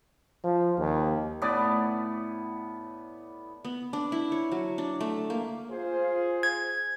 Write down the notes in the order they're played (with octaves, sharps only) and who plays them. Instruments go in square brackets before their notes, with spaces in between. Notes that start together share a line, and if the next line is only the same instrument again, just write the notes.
[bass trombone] F3
D#2
[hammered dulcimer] A2 B3 D5 B5
[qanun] B3
D4
E4
C#5
F#3
D4
A3
A#3
[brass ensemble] F4 G#4 C5
[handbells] G#6